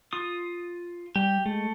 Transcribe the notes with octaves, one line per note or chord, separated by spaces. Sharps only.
F4 D#6
G3 G4
G#3 A3